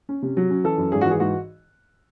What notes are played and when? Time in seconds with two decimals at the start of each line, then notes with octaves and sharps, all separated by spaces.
0.09 C#4
0.22 C3
0.37 F#3
0.50 C#4
0.64 E3 A4
0.78 F#2
0.92 G#1 G#4
1.01 F#4
1.06 E3 G#4
1.20 G#2 F#4